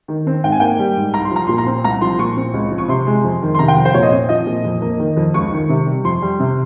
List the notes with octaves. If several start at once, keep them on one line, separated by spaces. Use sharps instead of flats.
D#3
C4
G#2 G5
G#5
A#3 G5
G3
G#2
C2 A#5
C6
F3 A#5
A#2 C6
A#5
C4
C2 A#5
F3 C6
A#2 C#6
C4
C#2
F3
C#6
C3 C6
G#3
F2
D#3
C6
C3 A#5
G5
F2
C5
A#2 C#5
D#5
C4
F3 D#5
A#2
F2
A#3
D#3
F2
C#2 C#6
D#3
C3
G3
F2 C6
G3
C3